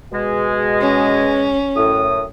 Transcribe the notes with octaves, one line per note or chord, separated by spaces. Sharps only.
B2 G#3
C#4
F#2 A2 D#6